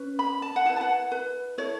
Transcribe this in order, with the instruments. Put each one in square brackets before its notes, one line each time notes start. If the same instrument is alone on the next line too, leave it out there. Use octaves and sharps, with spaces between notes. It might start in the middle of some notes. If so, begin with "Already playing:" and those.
Already playing: [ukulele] C#4 B4
B5
A5
F#5
E4 A5
B4
A5
F#5
B4
E4 A4 C#5